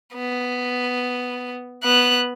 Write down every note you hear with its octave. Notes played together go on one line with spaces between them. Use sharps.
B3
B3 F#6